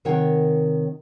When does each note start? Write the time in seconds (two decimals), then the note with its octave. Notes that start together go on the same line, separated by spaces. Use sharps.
0.05 C3 D#3 A#4 C#5 F#5 G5